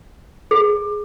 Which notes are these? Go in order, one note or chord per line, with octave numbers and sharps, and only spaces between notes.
G#4